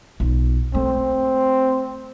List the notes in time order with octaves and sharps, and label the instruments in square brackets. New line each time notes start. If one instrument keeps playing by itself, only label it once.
[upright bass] B1 F4
[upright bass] A3 [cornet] C4